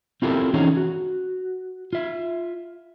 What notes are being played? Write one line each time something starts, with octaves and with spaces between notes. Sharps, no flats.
C4 E4 F4 G4 A4 A#4
E3 C#4 D#4 G#4 C#5 A#5
F#4
F4 E5